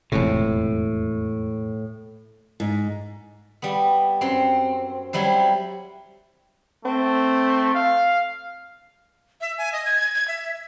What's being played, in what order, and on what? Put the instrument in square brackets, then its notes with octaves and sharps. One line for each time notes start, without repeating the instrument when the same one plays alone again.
[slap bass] E1 F2 C3 [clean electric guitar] A2
[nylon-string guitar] G#2
[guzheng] G3 B3
F#2 C4 C6
F#3 G3 E4 C5
[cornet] A3 [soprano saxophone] C4
[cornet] F5
[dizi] E5
G#5
D#5
G#6
G#6
E5